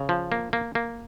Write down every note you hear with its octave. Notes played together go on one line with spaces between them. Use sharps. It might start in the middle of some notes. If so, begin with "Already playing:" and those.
Already playing: C#3
F3
A#3
A#3
A#3